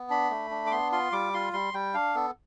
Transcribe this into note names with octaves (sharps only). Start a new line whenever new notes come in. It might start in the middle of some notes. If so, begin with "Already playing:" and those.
Already playing: B3
D4 B5
A3
D4
D6
B3 C6
F4 C6
G3 D6
F4 C6
G3 C6
G3 G5
D4 F5
B3 A4